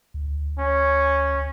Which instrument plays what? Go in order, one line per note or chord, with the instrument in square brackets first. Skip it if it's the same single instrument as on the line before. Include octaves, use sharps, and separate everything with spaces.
[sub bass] D2
[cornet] C#4